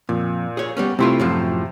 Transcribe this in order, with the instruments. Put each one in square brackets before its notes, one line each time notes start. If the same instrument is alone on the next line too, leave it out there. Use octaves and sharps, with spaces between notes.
[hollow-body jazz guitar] F2 [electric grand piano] A#2
[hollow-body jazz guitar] G#4 C#5
G3 B3 C#4
[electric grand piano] C3 A3 C6 [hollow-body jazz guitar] C4 E4 F4
[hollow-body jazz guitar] F#2 A2 F3